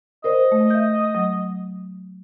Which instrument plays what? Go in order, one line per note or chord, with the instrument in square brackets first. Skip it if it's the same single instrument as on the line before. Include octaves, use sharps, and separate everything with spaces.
[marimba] A#4 C5 D5 [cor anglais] D#5
[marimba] A3
E5 G6
F#3